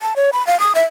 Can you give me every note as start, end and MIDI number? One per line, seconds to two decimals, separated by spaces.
0.02 0.14 81
0.16 0.30 73
0.33 0.45 83
0.47 0.59 77
0.60 0.72 87
0.75 0.84 76